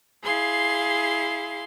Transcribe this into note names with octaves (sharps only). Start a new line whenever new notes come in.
E4 G#4 F5 C6